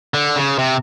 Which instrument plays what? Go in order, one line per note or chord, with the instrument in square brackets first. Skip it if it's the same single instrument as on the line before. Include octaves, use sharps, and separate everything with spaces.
[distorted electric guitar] D3
C#3
C3